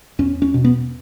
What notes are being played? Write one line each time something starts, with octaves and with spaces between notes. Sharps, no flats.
E2 C#4
C#4
B2
B3